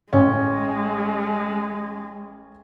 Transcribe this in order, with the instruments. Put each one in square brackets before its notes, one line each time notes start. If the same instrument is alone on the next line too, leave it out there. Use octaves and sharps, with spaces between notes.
[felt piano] A1 C#4 [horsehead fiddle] G#3